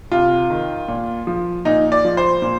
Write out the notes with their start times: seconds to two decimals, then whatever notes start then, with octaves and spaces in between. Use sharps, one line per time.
0.12 C3 F4
0.50 D#3
0.88 A#2
1.27 F3
1.65 A#2 D#4
1.92 D5
2.05 F3
2.17 C5
2.42 A#2